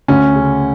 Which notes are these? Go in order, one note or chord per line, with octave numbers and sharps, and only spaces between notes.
D2 C#4
C#3